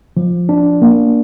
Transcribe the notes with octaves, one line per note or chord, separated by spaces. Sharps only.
F3
D4
A#3